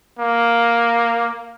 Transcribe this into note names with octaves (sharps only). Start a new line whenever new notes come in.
A#3